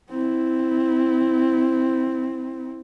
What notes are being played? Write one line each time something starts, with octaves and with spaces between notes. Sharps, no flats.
C4 E4